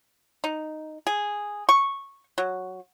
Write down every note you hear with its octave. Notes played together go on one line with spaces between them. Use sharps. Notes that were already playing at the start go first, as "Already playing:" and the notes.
D#4
G#4
C#6
F#3